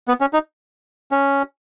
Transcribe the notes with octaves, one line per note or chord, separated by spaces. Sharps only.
B3
C#4
D#4
C#4